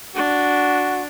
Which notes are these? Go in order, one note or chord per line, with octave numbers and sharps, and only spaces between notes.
D4 F#4